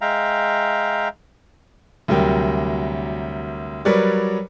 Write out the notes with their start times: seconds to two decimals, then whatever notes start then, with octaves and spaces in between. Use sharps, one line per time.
0.01 G#3 E5 F5 G5 A#5
2.08 D2 C3 F#3 G3 A#4 G5
3.85 F#3 G3 A#4 B4 C#5 D5